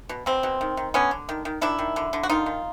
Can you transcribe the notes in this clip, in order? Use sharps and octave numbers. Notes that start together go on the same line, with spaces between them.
B2
B2 C4
B2
D#3
D#3
D3 B3 C#4
D3
D#3
D#3
D#3 D4 E4
D#3
D3
D3
F#4
D#3 D#4 F4
D#3